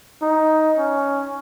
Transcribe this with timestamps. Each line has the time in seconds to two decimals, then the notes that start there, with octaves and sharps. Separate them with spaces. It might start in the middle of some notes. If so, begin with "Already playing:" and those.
0.22 D#4
0.78 C#4